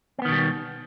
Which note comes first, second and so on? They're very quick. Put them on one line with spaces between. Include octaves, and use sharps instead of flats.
C4 B3 D#3 B2 G3